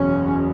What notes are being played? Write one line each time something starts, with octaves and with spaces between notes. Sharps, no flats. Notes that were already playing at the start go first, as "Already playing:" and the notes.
Already playing: F#1 E2 B2 C#4